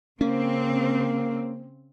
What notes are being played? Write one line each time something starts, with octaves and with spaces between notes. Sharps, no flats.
C#3 A#3 C4 C#4